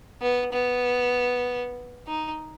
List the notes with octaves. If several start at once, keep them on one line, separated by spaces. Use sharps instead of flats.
B3
B3
D#4